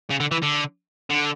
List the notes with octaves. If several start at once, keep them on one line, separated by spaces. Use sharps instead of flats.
C#3
D3
E3
D3
D3